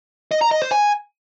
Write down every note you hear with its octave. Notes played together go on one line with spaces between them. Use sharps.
D#5
A#5
D#5
C5
G#5